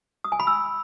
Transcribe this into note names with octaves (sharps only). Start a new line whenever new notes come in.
D#6
G#5
B5
E6